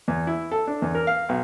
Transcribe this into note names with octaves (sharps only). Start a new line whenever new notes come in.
E2
E4
A4
D4
E2
A#4
F5
B1